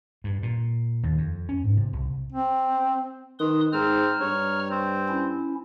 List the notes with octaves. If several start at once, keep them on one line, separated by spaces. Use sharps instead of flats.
G2
A#2
D#2
F2
C#4
G#2
C3
C2
C4
D#3 B4 C6 D#6
G#2 C4 A#5 F6
G2 C#5
C4
C#4 E4